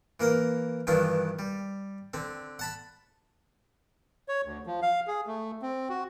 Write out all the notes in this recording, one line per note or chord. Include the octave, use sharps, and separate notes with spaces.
E3 A#3 A#4 F5
G2 D#3 E3 D4 E4 F4
G3
D3 C4
F#5 A5 B5
C#5
D2
F3
F5
G#4
A3
C4
F#4